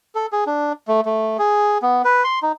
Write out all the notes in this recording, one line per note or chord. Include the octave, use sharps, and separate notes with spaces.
A4
G#4
D4
A3
A3
G#4
B3
B4
C6
D#4